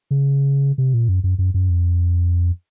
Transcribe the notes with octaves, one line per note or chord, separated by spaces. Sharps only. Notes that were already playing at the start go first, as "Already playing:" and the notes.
C#3
C3
A#2
F#2
F#2
F#2
F#2
F2